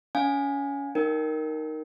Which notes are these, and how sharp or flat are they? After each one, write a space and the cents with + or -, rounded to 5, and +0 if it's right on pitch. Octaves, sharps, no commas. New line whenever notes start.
C#4 +25 F5 +40 G#5 +0
D#4 +0 A#4 +0 G5 -10